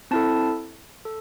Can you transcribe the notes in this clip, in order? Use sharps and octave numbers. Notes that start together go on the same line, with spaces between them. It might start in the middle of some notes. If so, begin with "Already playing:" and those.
C4 E4 A4 A5
A4